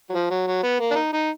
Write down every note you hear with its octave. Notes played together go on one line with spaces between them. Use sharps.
F#3
F3
F#3
F#3
B3
A#3
D4
D#4
D#4